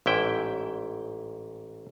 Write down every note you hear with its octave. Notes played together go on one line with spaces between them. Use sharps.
A1 G#2 E4 G5